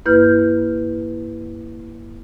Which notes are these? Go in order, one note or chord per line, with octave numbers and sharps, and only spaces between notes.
G2 A#3 E4 B4 F6 G6